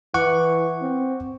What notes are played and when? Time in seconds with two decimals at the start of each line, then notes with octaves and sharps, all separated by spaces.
0.14 E3 F#5 C#6 D6
0.82 C4